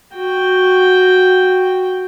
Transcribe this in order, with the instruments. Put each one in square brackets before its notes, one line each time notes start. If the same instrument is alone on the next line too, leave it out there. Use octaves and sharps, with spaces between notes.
[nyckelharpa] F#4 G5